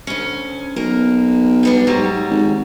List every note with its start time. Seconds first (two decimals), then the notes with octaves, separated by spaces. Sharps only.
0.07 D2 C#4
0.76 B1 A#3
1.63 G2 B3 D4
1.87 G#2 F#3 G3
2.30 G#1